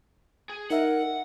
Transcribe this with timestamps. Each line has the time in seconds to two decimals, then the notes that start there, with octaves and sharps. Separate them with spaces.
0.49 G#4
0.71 D#4 A#4 E5 F#5